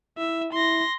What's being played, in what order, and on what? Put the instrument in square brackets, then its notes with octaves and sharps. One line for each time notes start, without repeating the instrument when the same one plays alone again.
[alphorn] E4 [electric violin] E5
[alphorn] E4 [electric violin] C6 A#6